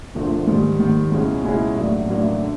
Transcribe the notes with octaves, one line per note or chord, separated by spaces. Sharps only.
E1 D2 D3 F3 A3
G#2 D#3 G3
G#2 D#3 G3
C#2 B2 G#3 C#4 E4
C#2 B2 G#3 C#4 E4
A1 A2 F#3 A#3 D4
A1 A2 F#3 A#3 D4
D3